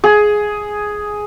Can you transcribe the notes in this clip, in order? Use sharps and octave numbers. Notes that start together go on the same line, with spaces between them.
G#4